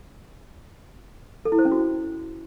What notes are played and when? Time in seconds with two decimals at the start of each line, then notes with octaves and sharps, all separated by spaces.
1.45 A4
1.52 E4
1.59 C5
1.65 C#4
1.72 F#4